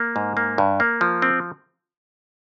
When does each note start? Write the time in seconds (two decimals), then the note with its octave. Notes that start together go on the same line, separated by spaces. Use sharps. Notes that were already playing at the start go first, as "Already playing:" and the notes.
Already playing: A#3
0.16 G#2
0.37 A#3
0.58 G2
0.80 A#3
1.01 F3
1.22 C4